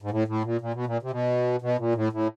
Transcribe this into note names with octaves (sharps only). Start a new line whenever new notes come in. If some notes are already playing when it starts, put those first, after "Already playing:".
G#2
A2
A2
A#2
A#2
B2
A#2
C3
B2
B2
A#2
A2
A2